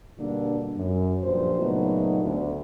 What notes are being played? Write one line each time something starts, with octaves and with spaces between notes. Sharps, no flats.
B2 D3 G3 A#3 D4
F#2
G2 A#2 F3 C5
A#2 C#3 F#3 A3 B3 D#4
D2